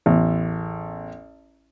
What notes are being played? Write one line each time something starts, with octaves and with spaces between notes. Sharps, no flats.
A1 E2